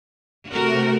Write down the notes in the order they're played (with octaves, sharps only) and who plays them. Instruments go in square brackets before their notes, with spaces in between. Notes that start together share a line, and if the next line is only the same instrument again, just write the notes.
[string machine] C3 A3 [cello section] F#4 A#4